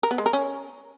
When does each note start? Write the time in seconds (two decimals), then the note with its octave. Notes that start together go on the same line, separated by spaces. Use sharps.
0.03 A#4
0.11 B3
0.18 G#3
0.26 A#4
0.33 C#4